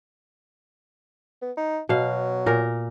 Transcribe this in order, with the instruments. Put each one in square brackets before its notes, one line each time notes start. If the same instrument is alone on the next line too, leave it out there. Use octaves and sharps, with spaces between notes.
[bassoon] B3
D#4
[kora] B2 F5 [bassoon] F#3
[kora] A#2 A#4